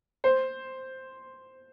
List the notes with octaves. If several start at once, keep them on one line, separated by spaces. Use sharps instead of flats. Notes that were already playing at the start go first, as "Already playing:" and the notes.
C5